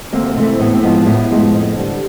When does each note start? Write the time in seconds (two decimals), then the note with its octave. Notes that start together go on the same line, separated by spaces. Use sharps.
0.13 D2 A#3 C4
0.36 C3 E3 A3
0.59 A2 B3
0.75 C4
0.83 F3 G#3 B3
1.06 A2 B3
1.30 F3 G#3
1.54 F2
1.77 D3 G3